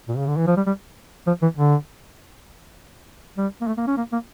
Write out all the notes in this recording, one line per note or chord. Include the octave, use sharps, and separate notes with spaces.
A#2
C#3
D3
E3
F3
G3
G3
F3
E3
D3
G3
A#3
A3
A#3
C#4
A#3
A#3